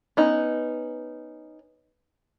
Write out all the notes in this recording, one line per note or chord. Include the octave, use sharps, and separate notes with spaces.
B3 C#4 D#4